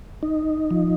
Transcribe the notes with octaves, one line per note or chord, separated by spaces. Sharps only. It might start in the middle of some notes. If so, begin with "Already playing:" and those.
D#4
F3